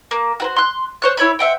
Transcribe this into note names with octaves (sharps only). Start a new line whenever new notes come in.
A#3
F#4 B4 C5
C6 F#6
C5 C#5 F#6
E4 C#5 E5 B5
C5 E5 F#5 G5